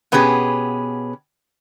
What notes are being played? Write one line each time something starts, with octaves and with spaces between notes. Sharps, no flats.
B2 B3 C#4 G4 G#4